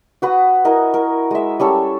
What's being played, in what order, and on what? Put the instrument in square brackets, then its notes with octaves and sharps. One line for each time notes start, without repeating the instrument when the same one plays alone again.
[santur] F#4 B4 D#6
E4 A#4 D#5
A#4
G#3 E5
G3 C#4 A4